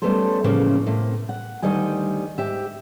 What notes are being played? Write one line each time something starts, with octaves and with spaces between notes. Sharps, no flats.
G3 A3 B3 C#4 A4 C5
A2 C#3 E3 F3 A#3 C#4
A2 C3 A#3
F#5
D2 D#3 G3 D#5 G#5
G#2 G4 E5